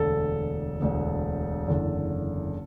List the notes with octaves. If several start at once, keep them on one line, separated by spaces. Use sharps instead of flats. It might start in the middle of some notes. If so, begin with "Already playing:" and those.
Already playing: E1 D2 D3 A4
E1 D2 D3
F#1 E2 D3